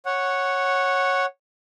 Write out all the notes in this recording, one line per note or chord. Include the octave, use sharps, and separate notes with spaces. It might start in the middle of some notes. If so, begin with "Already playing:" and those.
C#5 F#5